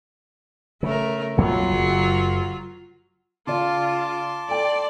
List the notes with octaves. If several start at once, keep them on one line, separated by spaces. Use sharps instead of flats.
C#3 A3 A#4
B1 F2 F#3 A#3 F4
F#1
C#3 F4 D5 A5 C6 D6
A4 D5 G5